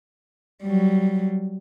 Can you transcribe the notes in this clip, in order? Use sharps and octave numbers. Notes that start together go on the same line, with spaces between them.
F#3 G3